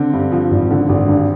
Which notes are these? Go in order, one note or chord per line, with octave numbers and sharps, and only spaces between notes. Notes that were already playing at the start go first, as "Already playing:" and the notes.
Already playing: D3 C4
G2
F3
G#1
D3
G#1
G2